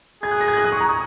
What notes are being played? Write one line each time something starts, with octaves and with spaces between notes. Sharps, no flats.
G#4 G#6
F#6
A#6
G#6
F#6
D#6
C#6
A#5
D#6